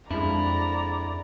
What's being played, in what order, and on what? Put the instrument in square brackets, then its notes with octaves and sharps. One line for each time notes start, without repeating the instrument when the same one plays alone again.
[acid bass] F2 [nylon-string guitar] G#3 D4 [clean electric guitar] E4 [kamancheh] D5 A#5